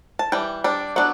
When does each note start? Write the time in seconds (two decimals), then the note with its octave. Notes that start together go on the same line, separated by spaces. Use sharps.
0.19 A5
0.32 E3 G3 G5
0.64 G3 D4
0.96 F#3 B3 D4 F#5